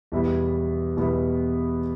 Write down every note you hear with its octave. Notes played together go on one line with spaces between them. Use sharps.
E2 B2 G3 B3 E4
E2 B2 G3 B3 E4